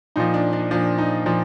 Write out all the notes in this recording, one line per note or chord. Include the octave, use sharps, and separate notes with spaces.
A#2 F3 D#4
D4
D4
A#2 F3 D4
D#4
A#2 F3